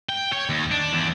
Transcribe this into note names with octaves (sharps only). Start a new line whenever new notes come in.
G5
C#5
D#2
D4
E2